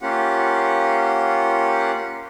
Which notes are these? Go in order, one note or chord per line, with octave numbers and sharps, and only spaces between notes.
A#3 C#4 F4 G4 F#5